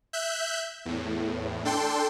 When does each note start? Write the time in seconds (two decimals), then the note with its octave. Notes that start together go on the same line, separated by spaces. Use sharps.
0.13 E5 F#6 G6
0.85 E2 A2
1.65 D4 A4 G5 C6